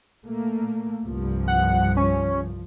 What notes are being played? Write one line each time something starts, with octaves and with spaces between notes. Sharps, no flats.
A#2 A3 A#3
C2 G2 F3
F#5
C#4